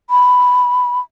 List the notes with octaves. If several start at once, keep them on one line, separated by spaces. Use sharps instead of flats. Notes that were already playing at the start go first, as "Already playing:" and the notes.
B5